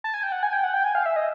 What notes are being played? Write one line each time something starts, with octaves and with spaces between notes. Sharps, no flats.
A5
G#5
G5
F#5
G#5
G5
F#5
G5
G#5
F5
E5
D#5